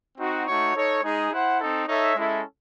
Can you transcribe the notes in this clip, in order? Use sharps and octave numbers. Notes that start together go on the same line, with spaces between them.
C4 D#4 F#4
A3 D#4 F#4 C#5
D#4 A4 C#5
G#3 D#4 G#4
E4 C5 F#5
C4 D#4 A4
D#4 A4 C#5 E5
G#3 C#4 E4 A4